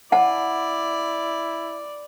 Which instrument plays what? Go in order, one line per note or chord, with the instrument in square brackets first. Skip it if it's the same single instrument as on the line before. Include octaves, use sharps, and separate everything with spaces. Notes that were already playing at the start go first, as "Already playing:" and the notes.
[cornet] E4 [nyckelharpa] D5 [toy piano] F#5 A5